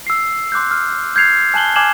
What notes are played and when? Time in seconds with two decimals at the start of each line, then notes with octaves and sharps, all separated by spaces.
0.07 E6 C7
0.52 C6 D6 F#6 G6
0.71 F6
1.15 F6 G6 G#6 C7 F7
1.54 G#5 A5 F#6 F#7 G7
1.76 G#5 D6 F6 G#6 E7 F#7